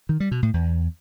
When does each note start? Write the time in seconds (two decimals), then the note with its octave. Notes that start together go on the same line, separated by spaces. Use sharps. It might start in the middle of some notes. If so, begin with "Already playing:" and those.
0.09 D#3
0.20 G3
0.31 B2
0.43 A2
0.54 E2